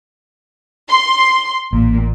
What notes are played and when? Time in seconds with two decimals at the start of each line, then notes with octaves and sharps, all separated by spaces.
0.90 C6
1.73 A1 A#2